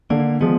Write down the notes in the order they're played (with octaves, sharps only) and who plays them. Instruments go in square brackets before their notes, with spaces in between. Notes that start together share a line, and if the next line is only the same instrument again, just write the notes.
[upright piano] D3 [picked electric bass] A#3
[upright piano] F3 G#3 [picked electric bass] B3